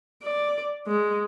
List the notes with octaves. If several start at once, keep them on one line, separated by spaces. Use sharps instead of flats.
D5
G#3